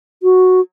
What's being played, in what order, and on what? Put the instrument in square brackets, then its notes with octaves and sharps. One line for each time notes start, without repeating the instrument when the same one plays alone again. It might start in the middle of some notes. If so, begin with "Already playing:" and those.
[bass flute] F#4